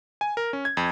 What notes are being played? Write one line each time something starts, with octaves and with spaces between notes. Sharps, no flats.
G#5
A#4
C#4
G#6
F2